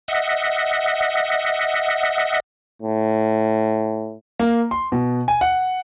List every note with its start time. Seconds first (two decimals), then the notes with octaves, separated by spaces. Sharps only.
0.08 D#5 E5 F#5
2.82 A2
4.39 A#3
4.71 C6
4.92 B2
5.28 G#5
5.41 F#5